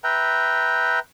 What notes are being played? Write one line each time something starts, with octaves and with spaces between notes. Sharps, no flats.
B4 E5 G5 A#5